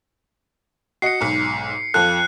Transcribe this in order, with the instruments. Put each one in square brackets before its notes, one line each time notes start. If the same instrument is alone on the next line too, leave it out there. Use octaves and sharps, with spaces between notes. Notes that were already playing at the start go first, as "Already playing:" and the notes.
[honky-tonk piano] F#4 D#5 [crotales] C7 C#7
[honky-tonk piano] B1 G#2
[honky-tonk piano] F2 F4 A4 [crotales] F#6